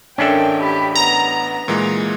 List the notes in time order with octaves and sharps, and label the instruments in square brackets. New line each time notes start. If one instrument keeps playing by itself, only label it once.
[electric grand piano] A1 E5 [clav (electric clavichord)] C#4 D4 A4 [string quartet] A#4 G5
[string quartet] G4 B5
[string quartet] B3 [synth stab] A#5
[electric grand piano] A#2 E3 G#3